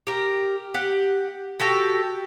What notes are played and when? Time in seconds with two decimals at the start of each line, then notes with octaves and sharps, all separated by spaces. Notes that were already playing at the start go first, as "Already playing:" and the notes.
0.07 G4 A#4
0.74 G4 F#5
1.60 F#4 G4 A4 G5